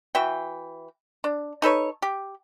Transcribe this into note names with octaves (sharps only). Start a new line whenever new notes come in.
E3 F#4 E5 G5
D4
D#4 A4 B4 C#5
G4